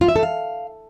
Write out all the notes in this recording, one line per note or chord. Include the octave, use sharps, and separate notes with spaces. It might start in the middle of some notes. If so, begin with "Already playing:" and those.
F4
E5
A4
F5